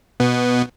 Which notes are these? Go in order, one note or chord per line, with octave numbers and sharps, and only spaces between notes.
B2 B3